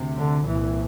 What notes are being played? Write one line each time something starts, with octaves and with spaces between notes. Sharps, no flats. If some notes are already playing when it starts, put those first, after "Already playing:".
Already playing: D2 C3
D3
C2 A#2 E3